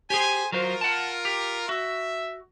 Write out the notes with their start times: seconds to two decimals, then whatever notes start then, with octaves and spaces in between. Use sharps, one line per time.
0.10 G4 G#4 C5 G#5
0.52 F#3 F4 A#4 C5
0.81 F#5 A5
1.25 G4
1.69 F#4 E5